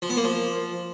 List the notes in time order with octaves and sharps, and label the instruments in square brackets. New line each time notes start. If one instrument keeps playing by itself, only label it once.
[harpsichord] F3
B3
A#3
F3